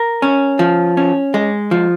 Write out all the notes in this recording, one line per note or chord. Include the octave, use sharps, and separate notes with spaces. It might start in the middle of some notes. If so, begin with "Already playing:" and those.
Already playing: A#4
C#4
F3
C#4
G#3
F3